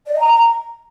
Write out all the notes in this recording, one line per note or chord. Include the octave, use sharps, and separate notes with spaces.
D5
D#5
A#5